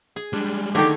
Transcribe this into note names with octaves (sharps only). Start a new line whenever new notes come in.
G#4
G3 G#3 D4
D3 D#3 A3 G4 G#4 A#4